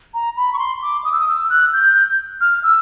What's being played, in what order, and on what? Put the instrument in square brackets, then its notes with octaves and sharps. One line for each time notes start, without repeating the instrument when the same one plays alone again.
[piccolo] A#5
B5
C#6
C6
D6
D#6
E6
D#6
E6
F#6
G6
F6
E6